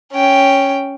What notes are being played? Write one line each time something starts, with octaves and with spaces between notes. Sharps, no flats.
C#4 G5